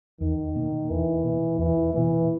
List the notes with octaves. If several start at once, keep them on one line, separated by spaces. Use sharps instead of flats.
E2 D#3
B2 A#3
E2 E3
B2 A#3
E2 E3
B2 E3 A#3